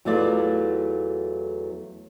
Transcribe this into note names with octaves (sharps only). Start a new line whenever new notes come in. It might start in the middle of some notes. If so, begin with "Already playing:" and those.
E2 F#3 A3 F4 D5